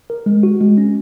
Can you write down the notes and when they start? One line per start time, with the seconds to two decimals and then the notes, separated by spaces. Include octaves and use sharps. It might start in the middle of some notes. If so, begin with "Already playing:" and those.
0.10 A#4
0.26 G#3
0.43 F#4
0.61 G#3
0.78 C#4